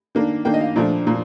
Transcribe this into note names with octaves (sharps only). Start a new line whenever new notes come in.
D#3 A#3 D4
D#3 A#3 D4 G5
D#5
F5
A#2 F3 A3 D4 D5
A#2 F3